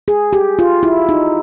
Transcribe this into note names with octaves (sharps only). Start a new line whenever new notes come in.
G#4
G4
F4
E4
D#4